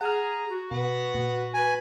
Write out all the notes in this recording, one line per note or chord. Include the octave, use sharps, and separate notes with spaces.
G#4 F#5 A#5 F6
F#4
B2 B4 F#5
A#2
B4 G#5